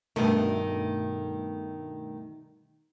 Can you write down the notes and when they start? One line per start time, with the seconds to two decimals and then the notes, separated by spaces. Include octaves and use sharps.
0.16 G2 B2 D#3 A3